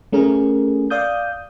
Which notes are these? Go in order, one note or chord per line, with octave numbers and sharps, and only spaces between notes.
A3 C#4 G#4 A#4
D5 F5 D#6 G6